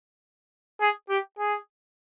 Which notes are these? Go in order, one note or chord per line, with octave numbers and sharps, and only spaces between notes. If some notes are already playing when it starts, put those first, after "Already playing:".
G#4
G4
G#4